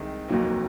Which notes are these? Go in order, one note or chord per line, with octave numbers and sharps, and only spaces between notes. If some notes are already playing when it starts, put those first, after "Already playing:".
Already playing: C2 C3 D#3 G#3
F1 D#2 D#3 F#3 A#3